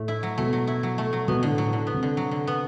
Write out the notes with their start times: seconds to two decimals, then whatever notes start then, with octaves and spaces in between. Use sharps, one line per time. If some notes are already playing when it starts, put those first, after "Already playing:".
Already playing: A2 A3
0.08 E4
0.23 F#3
0.38 B2 A3
0.53 F#3
0.67 E4
0.83 F#3
0.98 A3
1.13 F#3
1.28 B2 B3
1.43 A2 D3
1.58 A2 F#3
1.73 D3
1.87 B3
1.94 C3
2.03 D3
2.17 F#3
2.31 D3
2.47 B3